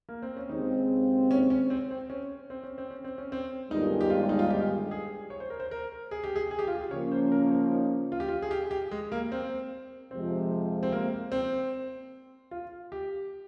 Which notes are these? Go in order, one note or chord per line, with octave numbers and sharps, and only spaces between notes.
A#3
C4
C#4
D#2 C#3 G#3 C4 D#4
C#4
C#4
C4
C4
C#4
C4
C#4
C4
C#4
C4
C#4
C4
G1 G2 D#3 G#3 D#4
G4
F4
D#4
F4
G4
G#4
C#5
C5
A#4
C5
A#4
G#4
G4
G#4
G#4
G4
F4
G4
C#3 F3 A#3 C#4 C#5
C5
A#4
C#5
C5
D#4
F4
G4
F4
G#4
G4
G4
G#3
A#3
C4
F2 C3 F3 G#3 C4
C4
A#3
C4
F4
G4